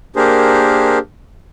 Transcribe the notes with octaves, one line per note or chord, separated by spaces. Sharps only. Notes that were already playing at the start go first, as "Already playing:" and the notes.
A#3 D4 G4 G#4 A#4 C5